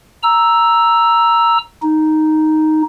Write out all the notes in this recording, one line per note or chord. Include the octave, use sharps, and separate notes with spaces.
A#5 E6
D#4